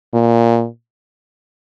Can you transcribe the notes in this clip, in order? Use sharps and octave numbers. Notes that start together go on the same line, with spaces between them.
A#2